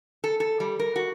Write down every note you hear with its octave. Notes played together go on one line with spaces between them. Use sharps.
A4
A4
G3
A#4
F#4